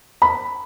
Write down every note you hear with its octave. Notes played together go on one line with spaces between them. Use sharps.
B5